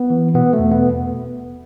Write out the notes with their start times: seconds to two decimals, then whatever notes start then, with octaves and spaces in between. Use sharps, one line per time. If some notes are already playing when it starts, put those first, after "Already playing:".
Already playing: B3
0.10 E3
0.34 B2 B3
0.53 A3
0.59 E2
0.72 B3